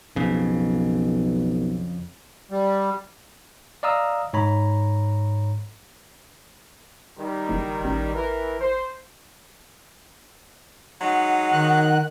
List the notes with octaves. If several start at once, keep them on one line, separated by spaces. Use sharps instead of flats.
B1 F2 C#3
G3
D5 D#5 F5 A#5 D#6 E6
G#2 C#5 A#5 B5
D#3 G3
F#1
A1
E3 A#4
C5
F#3 G#3 D#4 F#5
D#3 F#6